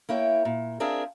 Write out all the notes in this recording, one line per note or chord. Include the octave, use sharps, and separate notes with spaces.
A#3 E4 C#5 G5
A#2
C4 D4 F4 G#4 A#4 E5